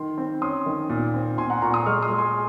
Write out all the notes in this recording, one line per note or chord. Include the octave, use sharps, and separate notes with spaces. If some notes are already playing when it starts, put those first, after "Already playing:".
Already playing: D#3 C6
C4
C#4 C6 D#6
D#3
A#2
C4
A#2 G#5 C6
F#5 A#5
A#2 A#5 C#6
C6 D#6
G#3 C#6 F6
C6 D#6
G#3
G#5 C6